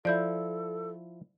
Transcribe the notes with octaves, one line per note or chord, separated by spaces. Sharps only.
F3 E4 A4 D5 G6